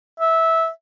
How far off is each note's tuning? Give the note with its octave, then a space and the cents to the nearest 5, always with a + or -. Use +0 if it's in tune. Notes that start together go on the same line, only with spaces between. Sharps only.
E5 -15